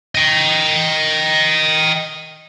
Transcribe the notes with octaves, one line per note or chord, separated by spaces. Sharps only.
D#5 G5